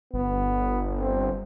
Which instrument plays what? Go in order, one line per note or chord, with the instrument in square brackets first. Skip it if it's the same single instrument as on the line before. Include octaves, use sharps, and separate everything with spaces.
[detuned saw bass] G1 [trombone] B3
[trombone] C4